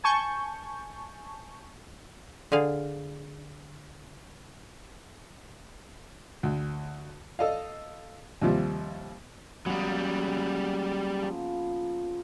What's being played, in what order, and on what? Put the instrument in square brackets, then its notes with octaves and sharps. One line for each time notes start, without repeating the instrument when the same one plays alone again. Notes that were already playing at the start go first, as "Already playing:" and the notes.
[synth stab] G#5 A5 C#6 G6
[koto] D3 G#4 F5
[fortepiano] D2
A4 D#5 F5
D#2 C3 F3 G3
[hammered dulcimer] C#3 A#3 B3 [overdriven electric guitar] F#3 G3
[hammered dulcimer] F3